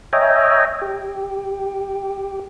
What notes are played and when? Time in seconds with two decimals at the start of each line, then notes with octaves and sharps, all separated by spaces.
0.13 C#5 D#5 E5 G5 G#5 A#5
0.82 G4